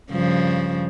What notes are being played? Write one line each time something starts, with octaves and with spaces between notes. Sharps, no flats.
G2 C#3 F3